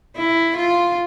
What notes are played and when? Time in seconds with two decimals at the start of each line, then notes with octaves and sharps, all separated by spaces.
0.16 E4
0.58 F4